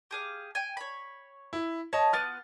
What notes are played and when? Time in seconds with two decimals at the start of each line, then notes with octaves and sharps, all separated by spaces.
0.11 G4 G#4 F5
0.55 G5 G#5
0.77 C#5 B5
1.53 E4
1.93 C#5 D#5 A5
2.13 B3 F4 D6 F6 A6